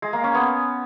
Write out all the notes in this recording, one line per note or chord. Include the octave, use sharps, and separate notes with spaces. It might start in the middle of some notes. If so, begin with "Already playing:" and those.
G#3
A#3
C#4
B3